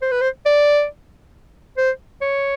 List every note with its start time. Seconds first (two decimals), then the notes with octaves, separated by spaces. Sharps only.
0.02 C5
0.12 B4
0.21 C5
0.46 D5
1.77 C5
2.21 C#5